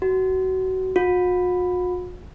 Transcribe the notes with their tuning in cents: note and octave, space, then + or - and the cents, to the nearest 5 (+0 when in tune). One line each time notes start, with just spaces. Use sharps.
F#4 +25
F#4 -45